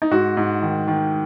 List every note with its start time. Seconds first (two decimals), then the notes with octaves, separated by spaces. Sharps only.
0.02 D#4
0.11 G#2 F#4
0.37 G#2
0.62 D#3
0.87 D#3